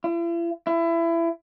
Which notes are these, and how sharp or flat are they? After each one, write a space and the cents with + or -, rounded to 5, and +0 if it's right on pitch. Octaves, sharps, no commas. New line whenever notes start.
E4 +45
E4 +25